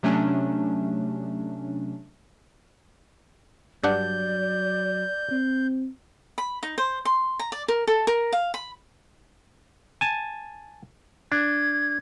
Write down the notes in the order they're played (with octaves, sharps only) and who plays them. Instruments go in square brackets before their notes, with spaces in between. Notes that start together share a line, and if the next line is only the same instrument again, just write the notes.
[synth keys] C3 F#3 A3 C#4 D4
[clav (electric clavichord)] G2 D4 F#5 [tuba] F#3 [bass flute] D5 [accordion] G6
[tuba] C4
[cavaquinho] B5
D#4
C5
C6
A#5
D5
A#4
A4
A#4
F5
B5
[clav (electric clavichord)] G#5 A5
[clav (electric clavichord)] D4 [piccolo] G#6